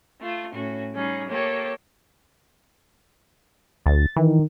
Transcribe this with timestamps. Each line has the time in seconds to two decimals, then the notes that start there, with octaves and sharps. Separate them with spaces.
0.20 A3 F4
0.53 A2 C#4 F#4
0.94 G3 C#4 D#4 G#4
1.28 A#3 G4 A4 C#5 G5
3.86 D2 A6
4.16 D#3 E3